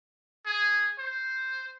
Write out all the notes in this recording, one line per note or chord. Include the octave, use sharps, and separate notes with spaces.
G#4
C5